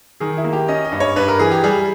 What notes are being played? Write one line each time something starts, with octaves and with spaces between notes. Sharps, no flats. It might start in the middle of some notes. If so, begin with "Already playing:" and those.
D#3 G#4
E4
A#3
G4
C#4 D#5
D#5
G2
C#5
G2 B4
A#4
E3 G#4
G4
G3 G#4